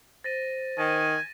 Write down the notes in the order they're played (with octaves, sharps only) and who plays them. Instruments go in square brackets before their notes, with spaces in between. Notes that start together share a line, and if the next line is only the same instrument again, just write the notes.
[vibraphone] C5 [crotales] A6 A#6 D#7
[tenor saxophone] D#3 [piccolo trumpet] G#5 [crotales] A#6 D#7